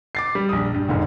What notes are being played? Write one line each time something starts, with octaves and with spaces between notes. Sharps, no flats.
D6 A6 C7
G3
A#1 D#6
G2
F1 G#2 D3